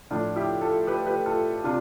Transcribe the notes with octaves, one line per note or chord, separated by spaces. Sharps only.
A2 F3 D4 F4
E4 G4
F4 A4
G4 B4
G4 B4
F4 A4
C3 D4 F4